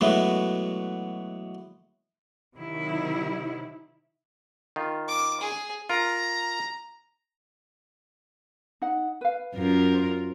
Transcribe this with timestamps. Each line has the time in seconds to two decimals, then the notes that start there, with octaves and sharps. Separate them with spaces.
0.01 B2 E3 F#3 G#3 A3 B3
2.53 C3 D#3 F#3 E4
4.76 D#3 F4
5.08 D6
5.40 G#4
5.90 F4 A#4 A#5
8.82 D#4 F#5
9.21 B4 F5
9.55 F#2 F4 A#4
9.94 C5